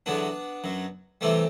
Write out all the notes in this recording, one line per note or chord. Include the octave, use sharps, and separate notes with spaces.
E2 D3 F#3 B3 D4
F#2 F#3
C3 E3 G3 A3 C4